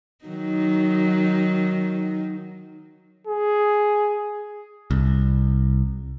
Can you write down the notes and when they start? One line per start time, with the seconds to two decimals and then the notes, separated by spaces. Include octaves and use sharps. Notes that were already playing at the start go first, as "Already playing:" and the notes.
0.25 D#3 F#3 D#4
3.27 G#4
4.91 C2